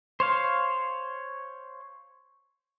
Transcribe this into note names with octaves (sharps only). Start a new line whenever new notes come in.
C5 C#5 F5